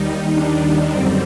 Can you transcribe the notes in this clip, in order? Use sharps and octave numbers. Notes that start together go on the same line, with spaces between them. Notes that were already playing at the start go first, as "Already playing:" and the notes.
Already playing: D#2 D#3 G3 D#4
D4
F#2 D3 G3 C4